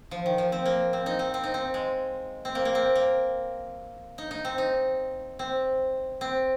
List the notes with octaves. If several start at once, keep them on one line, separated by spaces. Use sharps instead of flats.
F3
D#3
F3
C4
A#3
C4
D#4
C4
C4
D#4
C4
G#3
C4
A#3
A#3
C4
A#3
D#4
D#4
C4
D#4
C4
C4